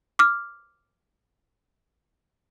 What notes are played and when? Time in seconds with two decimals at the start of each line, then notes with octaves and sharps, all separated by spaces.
0.19 D6 F6